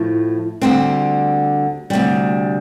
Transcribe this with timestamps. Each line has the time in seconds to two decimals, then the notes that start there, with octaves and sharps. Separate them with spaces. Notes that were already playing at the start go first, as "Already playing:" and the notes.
Already playing: A2 F3 A3
0.62 D2 D3 G3 C4
1.90 D2 C3 G3